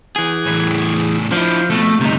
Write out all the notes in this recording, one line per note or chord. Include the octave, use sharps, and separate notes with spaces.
E3 G#4
E2 A2
F3 D4 E4
F2 B2 A3
D2 G2 C3 D#4